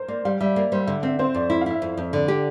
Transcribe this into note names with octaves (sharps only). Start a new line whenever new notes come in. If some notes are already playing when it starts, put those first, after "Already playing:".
Already playing: A#4 C5
A#3 D5
G3 F5
G3 E5
A#3 D5
G3 C5
D3 E5
C4 E5
C4 C5
F2 D5
E4 E5
F5
E4 E5
F2
F2
D3 D5
G4